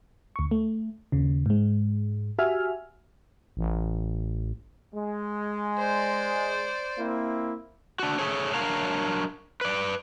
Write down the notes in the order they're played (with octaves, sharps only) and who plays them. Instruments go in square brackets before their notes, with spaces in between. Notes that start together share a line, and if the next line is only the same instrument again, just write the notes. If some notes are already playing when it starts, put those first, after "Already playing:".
[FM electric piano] D2 C#6
A3
D#2 C#3
G#2 G#3
F#4 G4 E5 G#5 F6
[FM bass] A1
[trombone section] G#3
[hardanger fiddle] C5 D5
[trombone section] A#3 C4 E4
[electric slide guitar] D4 F#4
A3 G#4 A4 C#5
F#3 D4 A#4 C#5 F5 A#5
B4 D5